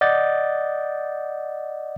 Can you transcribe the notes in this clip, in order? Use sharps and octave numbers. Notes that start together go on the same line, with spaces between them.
D5 D#5 F#5 G6 A6